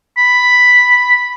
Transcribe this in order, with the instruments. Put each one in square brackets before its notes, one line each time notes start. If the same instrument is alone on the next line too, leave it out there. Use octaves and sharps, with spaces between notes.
[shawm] B5